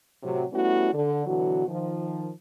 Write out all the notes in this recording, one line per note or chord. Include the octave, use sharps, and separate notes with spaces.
A2 C3 F#3
G3 A3 B3 C#4 E4 F#4
D3
B2 D3 E3 F#3 F#4
D#3 F3